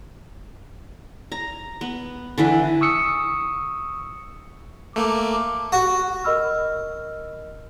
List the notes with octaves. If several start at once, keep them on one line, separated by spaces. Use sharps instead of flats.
A#5
B3
D3 E3 B4
C#6 D#6 E6 C#7
A3 A#3 D6
F#4
A#4 D#5 B5 E6 F6